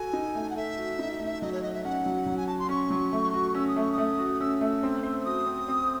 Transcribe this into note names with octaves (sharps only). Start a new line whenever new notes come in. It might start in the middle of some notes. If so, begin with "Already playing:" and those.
Already playing: F#4 A4 G#5
D#4
A3
F#5
A4 E5
F#4
D#4
A3
F#3 D#5
C#5
F#4 D#5
E5
C#4 F#5
F#3
F#3
G#5
F#4 A5
C6
C#4 C#6
F#3
A3
F#4
C#4 E6
D#6
A3 C#6
D#6
A3
F#4
C#4 E6
A3 E6
C4
C5
E6
F#4 D#6
C4
C4